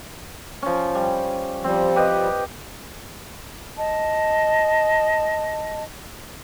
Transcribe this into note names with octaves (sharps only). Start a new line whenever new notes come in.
F3 C#4
G3
F3 G3 C4
G4 B4 D#5
D#5 A5